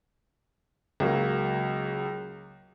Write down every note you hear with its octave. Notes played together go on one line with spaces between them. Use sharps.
C#2 F#3 A#3